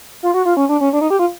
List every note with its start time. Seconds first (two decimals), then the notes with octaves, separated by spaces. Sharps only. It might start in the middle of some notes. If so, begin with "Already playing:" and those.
0.23 F4
0.34 F#4
0.45 F4
0.57 C#4
0.69 D4
0.81 C#4
0.93 D4
1.01 D#4
1.10 G4
1.19 F4